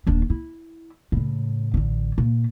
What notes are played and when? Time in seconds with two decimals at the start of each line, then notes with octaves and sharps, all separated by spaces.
0.07 D#1 D4
0.30 E4
1.12 A2 C#3
1.74 A1 D3
2.18 A#2